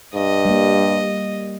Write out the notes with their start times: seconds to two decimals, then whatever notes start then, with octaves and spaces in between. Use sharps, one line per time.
0.14 G2 D#5
0.45 G3 A#3